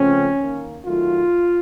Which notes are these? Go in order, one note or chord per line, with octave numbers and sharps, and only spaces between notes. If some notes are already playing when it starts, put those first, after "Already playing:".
Already playing: C#3 F3 A3 C4 C#4
D#3 A#3
D#3 F#3 A3 F4